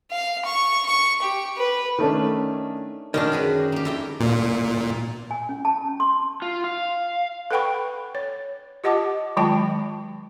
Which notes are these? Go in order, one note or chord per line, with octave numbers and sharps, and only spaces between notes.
F5
C#6
C#6
G4
B4
D#3 A3 C#4 D4
F#2 D#3 C#4 D4
F#4 G#4 B4
A#3 G4
F2 E4 G5
A#2
G#5
C#4
A5
C#4
C6
F4
F5
A4 B4 F#5 G5 B5 C#6
C#5
F4 G4 D#5 F#5 A5 D6
D#3 F#3 G#3 F4 G5 A5